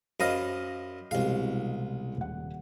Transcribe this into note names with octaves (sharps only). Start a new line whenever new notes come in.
F#2 C5 D#5 F5 B5 F6
C2 B2 E3 G#3 F5
D#1 F#5